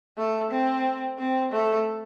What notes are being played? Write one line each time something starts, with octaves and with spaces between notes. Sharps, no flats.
A3
C4
C4
A3